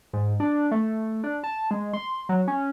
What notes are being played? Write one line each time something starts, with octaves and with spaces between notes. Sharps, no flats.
G#2
D4
A3
D4
A5
G#3
C6
F#3
C#4